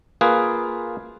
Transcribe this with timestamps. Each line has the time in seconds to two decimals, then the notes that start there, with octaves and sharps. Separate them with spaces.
0.21 A#3 F4 G#4 B4